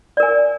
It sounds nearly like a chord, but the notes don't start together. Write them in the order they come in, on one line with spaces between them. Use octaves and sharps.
D5 A#4 G#5